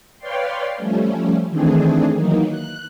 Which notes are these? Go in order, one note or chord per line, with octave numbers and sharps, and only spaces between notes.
B4 C#5 D5 F5 G5 C6
F3 G3 A3 C#4
D#3 E3 A3 C4 D4 G#4
D#3 E3 F#3 A#3 D#4
F#6